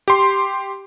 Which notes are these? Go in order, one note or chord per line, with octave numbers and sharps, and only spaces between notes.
G4 C6